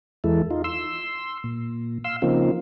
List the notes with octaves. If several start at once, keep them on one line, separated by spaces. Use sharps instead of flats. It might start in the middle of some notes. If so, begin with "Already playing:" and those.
E2 E3 G#3 E4 A4
D#4 F4
C6 E6
A#2
F5 C6 E6
C#3 F3 A#3 C4 D#4 F4